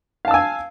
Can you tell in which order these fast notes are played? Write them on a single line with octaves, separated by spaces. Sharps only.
F5 A5 E6 G#5